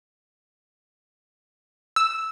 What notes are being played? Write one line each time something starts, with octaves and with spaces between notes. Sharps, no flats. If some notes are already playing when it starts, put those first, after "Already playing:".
E6